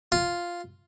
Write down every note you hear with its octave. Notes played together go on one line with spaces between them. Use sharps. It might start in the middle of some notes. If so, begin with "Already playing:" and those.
F4